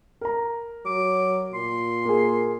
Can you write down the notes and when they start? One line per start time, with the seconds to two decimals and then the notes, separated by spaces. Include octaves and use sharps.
0.21 A#4 A#5
0.86 F#3 D6
1.54 A#2 C6
2.05 A#3 G#4